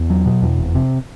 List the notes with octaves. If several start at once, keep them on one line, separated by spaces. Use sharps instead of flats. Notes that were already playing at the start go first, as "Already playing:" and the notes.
Already playing: E2
F#3
B2
E2
F1
C3